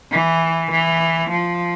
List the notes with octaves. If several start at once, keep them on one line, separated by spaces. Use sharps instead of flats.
E3
E3
F3